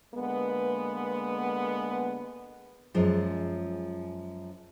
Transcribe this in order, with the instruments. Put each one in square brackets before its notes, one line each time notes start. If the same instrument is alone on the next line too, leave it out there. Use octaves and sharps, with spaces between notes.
[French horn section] D3 G#3 A#3 B3
[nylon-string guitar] F#2 F3 G#3